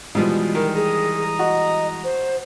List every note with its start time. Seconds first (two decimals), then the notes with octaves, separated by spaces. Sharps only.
0.15 B2 E3 F3 G3 G#3
0.55 D#3 A#4
0.75 G#4 A#5 D#6
1.39 F#4 D#5
2.04 C5